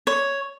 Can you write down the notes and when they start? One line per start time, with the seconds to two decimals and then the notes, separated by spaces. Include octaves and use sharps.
0.07 C#5